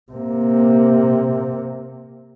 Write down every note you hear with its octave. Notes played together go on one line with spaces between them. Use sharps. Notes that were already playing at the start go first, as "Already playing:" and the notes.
C3 A#3